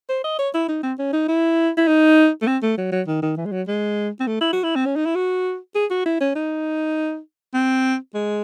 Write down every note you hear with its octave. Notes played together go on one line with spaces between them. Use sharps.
C5
D#5
C#5
E4
D#4
C4
C#4
D#4
E4
E4
D#4
A3
C4
A3
F#3
F#3
D#3
D#3
E3
G#3
F#3
G#3
C4
A3
E4
F#4
E4
C4
C#4
D#4
E4
F#4
G#4
F#4
E4
C#4
D#4
C4
G#3